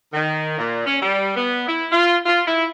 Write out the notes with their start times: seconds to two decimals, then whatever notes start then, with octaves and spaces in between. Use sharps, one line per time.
0.13 D#3
0.58 A#2
0.86 C#4
1.02 G3
1.36 B3
1.68 E4
1.92 F4
2.26 F4
2.47 E4